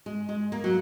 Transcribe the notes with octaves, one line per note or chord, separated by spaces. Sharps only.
G#3
G#3
A#3
F#3